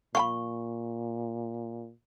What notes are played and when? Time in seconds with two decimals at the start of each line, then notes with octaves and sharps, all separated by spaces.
0.15 A#2 F5 G5 B5 C#6